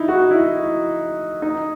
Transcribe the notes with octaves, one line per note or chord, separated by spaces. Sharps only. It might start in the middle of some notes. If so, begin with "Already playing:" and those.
Already playing: D#4 E4
F#4
E4
D#4